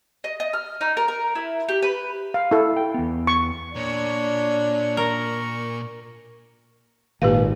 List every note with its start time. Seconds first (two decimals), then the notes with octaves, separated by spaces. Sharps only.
0.24 D#5
0.40 D#5
0.53 F6
0.81 D#4
0.97 A#4
1.08 A#4
1.35 E4
1.69 G4
1.82 B4
2.34 F5
2.51 E4 A4
2.77 G5
2.94 E2 B3
3.27 C#6
3.76 A#2 D4 C#5 C#6
4.97 A#4 C#6
7.22 G#1 A#2 G4 B4 F5